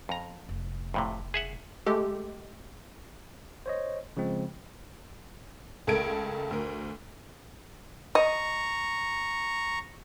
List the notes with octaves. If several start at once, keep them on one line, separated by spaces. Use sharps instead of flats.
F2 A#5
F1
F2 A2 C3
G#4 E5 F#5
G#3 A3 G4 A4
C5 C#5 D#5
C#3 F3 G#3 C4
C#2 A3 A4 A#4 G#6 D7
D2 A#4
D#5 A#5 C#6